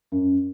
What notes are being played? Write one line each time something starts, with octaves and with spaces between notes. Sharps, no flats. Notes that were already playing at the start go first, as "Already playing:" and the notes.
F#2